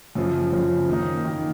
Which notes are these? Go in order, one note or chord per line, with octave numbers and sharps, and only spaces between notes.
F#2 C#3 F3
F#2 C#3 F3
D#3 A#3 D#4
D#3 A#3 D#4